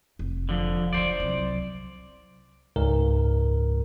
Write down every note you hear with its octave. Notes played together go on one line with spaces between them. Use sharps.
F1
D3 F3
D#3 F3 C5 D5
C2 F#3
C#2 G#2 A#4